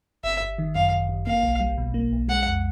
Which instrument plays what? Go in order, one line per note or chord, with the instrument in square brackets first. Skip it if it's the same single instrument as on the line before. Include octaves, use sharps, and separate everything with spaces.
[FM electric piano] G1 [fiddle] E5
[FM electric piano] G1
D#3
[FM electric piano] F#2 [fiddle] F5
[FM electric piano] G1
G1
[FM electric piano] A#3 [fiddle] F5
[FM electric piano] B1
G3
B2
A#3
B1
[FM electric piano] G#3 [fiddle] F#5
[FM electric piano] F2